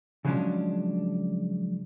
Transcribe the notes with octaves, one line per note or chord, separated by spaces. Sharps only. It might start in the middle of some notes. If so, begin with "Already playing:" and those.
C#3 F3 F#3 G#3 C#4 D4